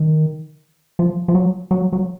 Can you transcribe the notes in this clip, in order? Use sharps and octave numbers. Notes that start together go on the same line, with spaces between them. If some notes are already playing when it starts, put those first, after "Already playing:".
Already playing: D#3
F3
F3
F#3
F#3
F#3